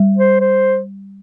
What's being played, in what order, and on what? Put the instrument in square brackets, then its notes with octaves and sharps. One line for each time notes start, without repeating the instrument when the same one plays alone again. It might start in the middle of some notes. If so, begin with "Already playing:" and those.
Already playing: [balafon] G3
[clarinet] C5
C5